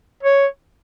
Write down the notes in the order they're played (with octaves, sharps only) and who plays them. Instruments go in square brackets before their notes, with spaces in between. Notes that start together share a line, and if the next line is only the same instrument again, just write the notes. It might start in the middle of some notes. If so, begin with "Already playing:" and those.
[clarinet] C#5